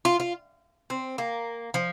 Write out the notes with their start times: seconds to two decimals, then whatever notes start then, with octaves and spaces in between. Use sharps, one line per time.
0.05 F4
0.20 F4
0.90 C4
1.18 A#3
1.74 F3